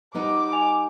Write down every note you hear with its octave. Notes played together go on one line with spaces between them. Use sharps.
G3 B3 D#4 D6
D#5 G#5 F7